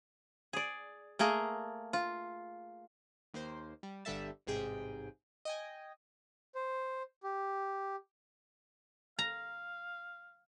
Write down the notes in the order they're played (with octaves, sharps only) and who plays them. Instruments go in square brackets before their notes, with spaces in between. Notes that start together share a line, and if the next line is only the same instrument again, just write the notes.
[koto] G#4 D5
A3 A#3 G#4 A#4
F4
[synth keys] D#2 A#3 C5
G3
G1 D3 G3 A4 E5 A5
A1 G#2 C3 G#4 G5
D#5 G5 G#5
[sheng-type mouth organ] C5
G4
[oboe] F5 [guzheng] A#5